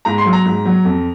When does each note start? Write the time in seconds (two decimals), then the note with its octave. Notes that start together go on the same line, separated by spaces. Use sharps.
0.05 G#2 A#5
0.18 C6
0.26 F#3
0.33 A#5
0.45 G#2
0.65 F#3
0.85 F2